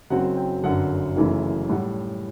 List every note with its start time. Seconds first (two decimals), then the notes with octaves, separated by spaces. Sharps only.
0.10 F#1 F#2 F#3 C4 F#5
0.37 G5
0.63 G1 F#2 D3 F#5
1.16 F#1 F#2 E3 A3 E4
1.69 A2 G3 F#5